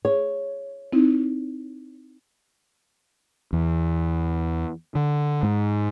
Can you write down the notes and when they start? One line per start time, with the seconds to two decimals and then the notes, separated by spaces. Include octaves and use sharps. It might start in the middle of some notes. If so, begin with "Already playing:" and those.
0.05 G#4 C#5
0.93 C4 D#4 E4
3.53 E2
4.95 D3
5.43 G#2